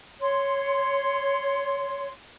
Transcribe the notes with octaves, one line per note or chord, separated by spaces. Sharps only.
C#5 C6